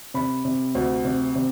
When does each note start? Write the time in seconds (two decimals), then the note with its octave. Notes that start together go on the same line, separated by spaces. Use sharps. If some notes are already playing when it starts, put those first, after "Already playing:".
0.14 C3 B5
0.45 C3
0.75 D2
1.05 C3
1.35 C3